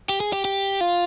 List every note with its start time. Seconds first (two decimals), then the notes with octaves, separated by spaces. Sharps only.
0.09 G4
0.20 G#4
0.33 G4
0.45 G4
0.81 F4